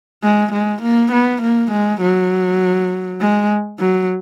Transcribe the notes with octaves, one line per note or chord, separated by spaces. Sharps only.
G#3
G#3
A#3
B3
A#3
G#3
F#3
G#3
F#3